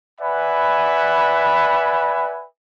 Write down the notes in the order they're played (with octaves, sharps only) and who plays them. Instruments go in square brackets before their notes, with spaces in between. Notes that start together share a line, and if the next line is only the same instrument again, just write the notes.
[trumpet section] B4 D5 E5 F#5 G#5 B5